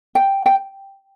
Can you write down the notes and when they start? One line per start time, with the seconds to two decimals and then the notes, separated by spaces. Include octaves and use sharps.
0.15 G5
0.46 G5